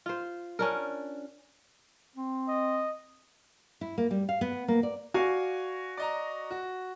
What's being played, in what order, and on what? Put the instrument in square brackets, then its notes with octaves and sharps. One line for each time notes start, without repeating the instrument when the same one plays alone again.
[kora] F4 C5
C#4 D4 A#4
[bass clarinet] C4
[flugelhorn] D#5
[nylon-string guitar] E4
A#3
G3
F5
B3
A#3
D5
[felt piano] F#4 [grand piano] D5 F5 G#5
[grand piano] D5 D#5 A#5
F#4